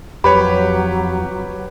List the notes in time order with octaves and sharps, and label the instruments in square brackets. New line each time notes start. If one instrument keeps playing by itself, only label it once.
[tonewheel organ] F2 [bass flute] F#3 [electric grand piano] G4 B4 C#5 [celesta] B5